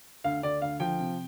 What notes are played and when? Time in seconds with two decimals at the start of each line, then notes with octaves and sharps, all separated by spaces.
0.24 D2 F5
0.43 D2 D5
0.62 D2 F5
0.80 F3 G5
0.99 C3